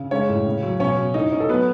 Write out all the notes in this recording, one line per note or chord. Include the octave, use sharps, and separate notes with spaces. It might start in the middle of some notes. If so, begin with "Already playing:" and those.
Already playing: C#3
G#3 C#4 C#5
A2
C#3
F#3
B2 C#4 C#5
B2
E3 D#4 D#5
C#4
A4
F#3 B3 B4